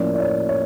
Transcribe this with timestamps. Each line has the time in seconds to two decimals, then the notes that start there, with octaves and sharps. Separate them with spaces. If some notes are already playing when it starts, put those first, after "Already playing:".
Already playing: A2 F3 A#3 C#4 E4 D5
0.15 D5
0.20 C#5
0.49 C#5